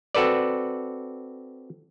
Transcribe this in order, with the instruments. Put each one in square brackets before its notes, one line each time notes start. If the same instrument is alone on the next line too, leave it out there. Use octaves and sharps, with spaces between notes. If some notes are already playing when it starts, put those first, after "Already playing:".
[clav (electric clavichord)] C4 F#4 A4 B4 D5